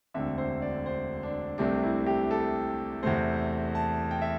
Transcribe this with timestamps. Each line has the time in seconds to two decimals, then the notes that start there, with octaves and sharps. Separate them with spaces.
0.14 E1 D2 D3 C4 E5
0.38 C5
0.62 D5
0.86 C5
1.23 D4
1.58 C2 C3 A3 C4 D4
1.83 E4
2.06 G4
2.31 A4
3.03 E2 C3 A3 C5
3.75 A5
4.11 G5
4.21 E5